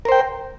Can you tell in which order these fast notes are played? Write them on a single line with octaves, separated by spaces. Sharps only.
A#4 C5 G5